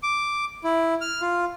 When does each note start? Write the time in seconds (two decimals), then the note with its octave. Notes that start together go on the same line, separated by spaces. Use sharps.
0.03 D6
0.64 E4
1.01 F6
1.21 F4